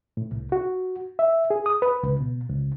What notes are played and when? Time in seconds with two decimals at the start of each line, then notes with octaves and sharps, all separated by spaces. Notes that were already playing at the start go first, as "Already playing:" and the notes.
0.17 A2
0.31 C2
0.52 F#4
1.19 E5
1.50 G#4
1.66 D#6
1.82 B4
2.03 C#2
2.21 B2
2.50 C#2